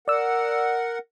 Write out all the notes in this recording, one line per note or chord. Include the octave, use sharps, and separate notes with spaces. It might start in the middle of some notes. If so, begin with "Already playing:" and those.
A#4 D5 F#5 E6